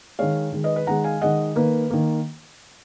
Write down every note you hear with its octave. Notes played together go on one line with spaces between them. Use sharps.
D#3 G#3 C#5 F5
D#3 G#3
B4 D#5
B4
D#3 G#3 F#5 A#5
F5 G#5
D#3 G#3 D#5 F#5
D#3 A#3 B4
D#3 A#3